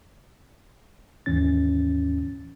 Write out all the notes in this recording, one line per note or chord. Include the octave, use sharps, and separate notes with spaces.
D#2 G#2 E3 C#4 A6